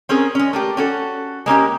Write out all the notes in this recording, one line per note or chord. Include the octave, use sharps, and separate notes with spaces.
C4 C#4 G#4 A#4
G#3 C#4
A3 A#3 G4
C#4 F#4 A4
G#3 A#3 C#4 G4